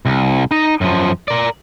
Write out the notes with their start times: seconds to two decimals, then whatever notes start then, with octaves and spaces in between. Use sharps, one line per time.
0.06 C2
0.51 D#4 A#5
0.81 F#2 F3
1.28 A#4 D5